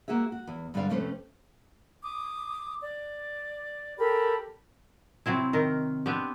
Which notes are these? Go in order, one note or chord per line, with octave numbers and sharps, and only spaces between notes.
A#3 F#4 G#4 E5
F#4
E2
G2 D3 G3 D4 D5 F5
F2 C3 A3 C#4 B4 C5
D6 D#6
D5
G4 A4 A#4 B5
C3 F#3 C4 E4
D#3 A#4
B3 C4 D4 G4